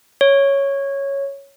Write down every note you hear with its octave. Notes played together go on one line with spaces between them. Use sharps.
C#5